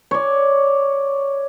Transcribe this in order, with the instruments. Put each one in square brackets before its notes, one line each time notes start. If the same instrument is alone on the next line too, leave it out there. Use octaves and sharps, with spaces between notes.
[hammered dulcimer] C#5 D5